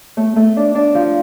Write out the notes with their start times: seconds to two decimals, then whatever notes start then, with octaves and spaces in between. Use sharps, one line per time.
0.17 A3
0.36 A3
0.57 D4
0.75 D4
0.95 F3